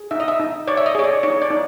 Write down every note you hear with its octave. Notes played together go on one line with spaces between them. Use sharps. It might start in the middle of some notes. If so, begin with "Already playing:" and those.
Already playing: G#4
D#4 E5
D#5
E5
D#4
C#5 D5
E5
D#5
G#4 C#5
D5
D#4 C#5
D5
D#4